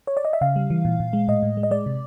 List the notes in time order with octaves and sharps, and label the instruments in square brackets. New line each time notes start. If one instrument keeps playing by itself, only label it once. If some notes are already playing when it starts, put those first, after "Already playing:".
[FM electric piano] C#5
D5
D#5
E5
C#3 F5
G3
E3
A#2
A#2
G#3
A2 D#5
A2
G#3
D#5
G#3 D5
C3